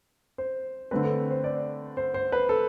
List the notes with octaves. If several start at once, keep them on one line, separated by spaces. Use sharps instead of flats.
C5
D3 A3 C4 B4
A4
C5
D5
C5
C5
B4
A4